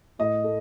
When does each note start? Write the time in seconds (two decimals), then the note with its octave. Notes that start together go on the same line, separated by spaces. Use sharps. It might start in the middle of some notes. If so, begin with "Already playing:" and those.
0.19 A2 D#5
0.44 A3